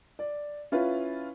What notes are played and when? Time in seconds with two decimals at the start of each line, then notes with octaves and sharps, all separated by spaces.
0.19 D5
0.72 C#4 E4 F4 B4